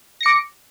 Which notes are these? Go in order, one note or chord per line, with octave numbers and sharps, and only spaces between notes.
D6 A#6 C#7